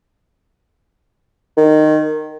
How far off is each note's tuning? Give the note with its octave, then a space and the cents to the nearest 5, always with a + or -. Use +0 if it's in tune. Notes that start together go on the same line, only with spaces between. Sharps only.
D#3 -15